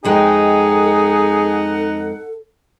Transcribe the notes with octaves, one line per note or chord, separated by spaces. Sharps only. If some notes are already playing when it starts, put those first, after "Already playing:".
F2 G#3 D#4 G#4 A4 F#5 G5